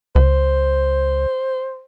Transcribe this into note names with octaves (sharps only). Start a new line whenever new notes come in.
C#2 C5